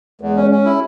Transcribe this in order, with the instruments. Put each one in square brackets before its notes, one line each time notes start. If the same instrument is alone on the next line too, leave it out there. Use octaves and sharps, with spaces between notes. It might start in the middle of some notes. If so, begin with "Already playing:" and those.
[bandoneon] E2 [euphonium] G#3
[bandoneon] C#4
C#4
E4